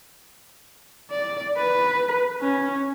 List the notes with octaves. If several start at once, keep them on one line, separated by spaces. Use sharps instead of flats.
D5
B4
C#4